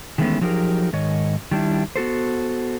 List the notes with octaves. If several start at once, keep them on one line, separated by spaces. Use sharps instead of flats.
D#3 E3 G#3 A3 B3 C#4
F3 F#3 D#4 G4 G#4 A#4
G#2 D#3 C#5 D#5
D#3 G3 D4 E4
B3 F#4 A4 C5